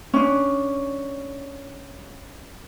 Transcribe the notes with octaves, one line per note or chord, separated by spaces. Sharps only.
C#4 D4